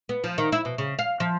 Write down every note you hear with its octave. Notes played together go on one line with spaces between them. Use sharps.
B3
F3
D#3
E4
B2
C#3
F5
F3